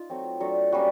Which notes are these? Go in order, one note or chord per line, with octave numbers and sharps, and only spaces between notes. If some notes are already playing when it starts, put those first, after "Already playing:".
Already playing: D#4 F4
F#3 A3 C4
F#3 A3 D4
G3 A#3 C#4 F#4